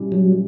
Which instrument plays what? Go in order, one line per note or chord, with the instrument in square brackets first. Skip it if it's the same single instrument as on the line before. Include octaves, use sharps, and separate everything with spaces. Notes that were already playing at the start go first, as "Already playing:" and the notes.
Already playing: [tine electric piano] A#2 G3 C#4 E4 G4
[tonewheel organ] F#3